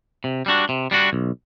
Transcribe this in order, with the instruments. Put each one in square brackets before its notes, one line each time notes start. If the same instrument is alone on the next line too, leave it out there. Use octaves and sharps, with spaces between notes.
[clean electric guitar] C3
G3 D4 F#4
C3
G3 D4 F#4
B1